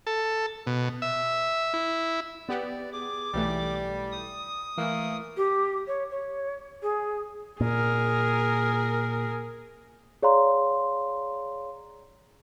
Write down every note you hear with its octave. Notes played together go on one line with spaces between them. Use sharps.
A4
B2
E5
E4
B3 G4 D5
G#4 D6
B1 E3 G3 A3 D5
D#6
E3 A3 A#3
G4
C#5
C#5
G#4
A#2 G#4 A#4
G#4 C#5 D5 F5 A#5 C6